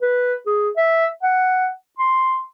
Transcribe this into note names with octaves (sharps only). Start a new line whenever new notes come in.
B4
G#4
E5
F#5
C6